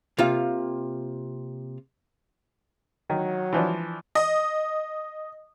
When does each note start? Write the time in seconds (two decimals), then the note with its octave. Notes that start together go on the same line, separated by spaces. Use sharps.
0.18 C3 A#3 F4 F5
3.10 D#3 F#3
3.53 E3 F3 D4
4.15 D#5